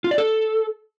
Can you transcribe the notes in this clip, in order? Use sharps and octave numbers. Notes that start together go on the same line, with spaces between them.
F4
D5
A4